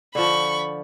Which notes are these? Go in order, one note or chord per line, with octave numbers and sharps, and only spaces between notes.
D3 F3 B5 C#6